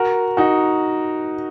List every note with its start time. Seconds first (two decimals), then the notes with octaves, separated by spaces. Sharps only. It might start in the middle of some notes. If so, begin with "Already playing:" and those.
Already playing: F#4 A#4
0.37 D#4 F#4